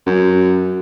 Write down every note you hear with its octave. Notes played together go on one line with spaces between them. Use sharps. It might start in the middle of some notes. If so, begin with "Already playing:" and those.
F#2